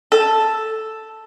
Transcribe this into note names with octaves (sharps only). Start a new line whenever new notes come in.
A4